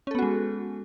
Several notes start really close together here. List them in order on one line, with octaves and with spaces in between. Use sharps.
C#4 A4 B3 F#4 G#3